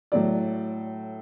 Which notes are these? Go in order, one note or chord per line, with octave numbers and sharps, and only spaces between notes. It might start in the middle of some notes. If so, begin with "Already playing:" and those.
A2 F#3 D5